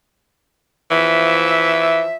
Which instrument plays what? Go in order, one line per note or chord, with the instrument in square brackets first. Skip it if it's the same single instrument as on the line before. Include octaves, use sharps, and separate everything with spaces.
[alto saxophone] E3 [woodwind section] F3 E5